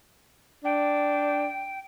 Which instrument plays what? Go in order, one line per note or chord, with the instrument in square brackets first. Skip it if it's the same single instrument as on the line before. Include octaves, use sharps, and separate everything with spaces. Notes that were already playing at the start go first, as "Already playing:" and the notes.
[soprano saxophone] D4 [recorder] G5